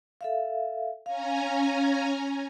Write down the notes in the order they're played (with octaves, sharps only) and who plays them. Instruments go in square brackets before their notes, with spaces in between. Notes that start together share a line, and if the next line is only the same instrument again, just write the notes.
[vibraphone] A4 E5 F5
[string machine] C#4 G#5 A#5 [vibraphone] F5